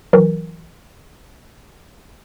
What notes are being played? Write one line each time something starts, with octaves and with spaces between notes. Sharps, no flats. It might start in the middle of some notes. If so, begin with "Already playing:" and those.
E3 F#3 A#4